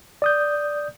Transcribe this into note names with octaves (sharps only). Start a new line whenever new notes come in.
D5 D#6 G6